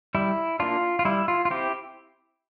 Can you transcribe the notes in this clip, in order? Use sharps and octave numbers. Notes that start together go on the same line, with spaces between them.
G3 E4
A#3 D4 F4
F4
G3 E4
F4
F4
C4 E4 G4